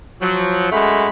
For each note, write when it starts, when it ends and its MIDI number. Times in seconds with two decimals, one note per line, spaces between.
0.22 0.67 53
0.22 0.67 54
0.72 1.09 42
0.72 1.09 56
0.72 1.09 57
0.72 1.09 78
0.72 1.09 83